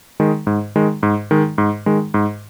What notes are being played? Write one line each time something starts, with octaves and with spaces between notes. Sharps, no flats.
D#3 G#3
G#2
D#3 G#3
G#2
D#3 G#3
G#2
D#3 G#3
G#2